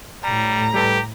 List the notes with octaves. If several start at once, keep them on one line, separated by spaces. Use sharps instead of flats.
A2 G3 A#5
G3 G4 A4 B4